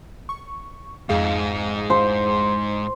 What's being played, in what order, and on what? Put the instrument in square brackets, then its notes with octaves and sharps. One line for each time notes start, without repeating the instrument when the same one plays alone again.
[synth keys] C#6
[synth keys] F2 G#4 F5 [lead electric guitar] G#2 D#4
[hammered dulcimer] C5